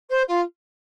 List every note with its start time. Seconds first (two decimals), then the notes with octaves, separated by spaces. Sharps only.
0.10 C5
0.28 F4